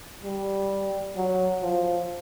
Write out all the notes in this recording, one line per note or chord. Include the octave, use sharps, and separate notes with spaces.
G3
F#3
F3